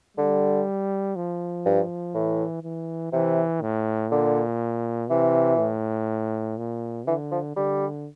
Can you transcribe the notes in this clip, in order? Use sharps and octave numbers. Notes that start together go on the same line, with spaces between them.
D3 G3
F3
G2
A2 E3
E3
C3 E3
A2
A#2 D3
C3 E3
A2
A#2
D3 E3
F3
D3 G3